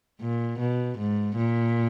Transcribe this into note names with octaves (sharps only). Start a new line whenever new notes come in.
A#2
B2
G#2
A#2